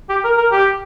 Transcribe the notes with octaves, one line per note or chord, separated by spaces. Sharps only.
G4
A#4
A#4
G4